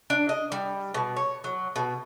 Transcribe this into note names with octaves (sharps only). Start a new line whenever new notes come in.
D4
D#5
G3
B2
C#5
F#3
B2